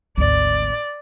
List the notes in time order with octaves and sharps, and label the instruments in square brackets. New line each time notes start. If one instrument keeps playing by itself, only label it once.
[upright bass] G#1 D2 [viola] D5